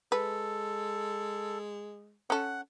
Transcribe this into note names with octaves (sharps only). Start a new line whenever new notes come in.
G#3 A4 B4
C#4 A4 F#5